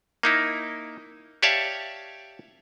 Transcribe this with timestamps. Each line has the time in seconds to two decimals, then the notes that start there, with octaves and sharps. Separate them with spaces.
0.23 A#3 D#4 E4
1.43 G4 C#5 D5 E5 F5 A5